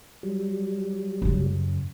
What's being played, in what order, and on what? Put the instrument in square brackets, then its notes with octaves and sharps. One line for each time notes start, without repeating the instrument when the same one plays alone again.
[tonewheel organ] F#3 G3
[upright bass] F#2 C#3